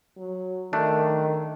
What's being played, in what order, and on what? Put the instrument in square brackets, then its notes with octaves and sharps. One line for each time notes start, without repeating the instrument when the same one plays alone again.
[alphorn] F#3
[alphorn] D#3 [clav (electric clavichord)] A3 D4